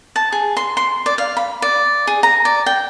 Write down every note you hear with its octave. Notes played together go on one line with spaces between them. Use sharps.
A5
G#4
C6
C6
D5
F5
B5
D5
G#4
A#5
D5
G5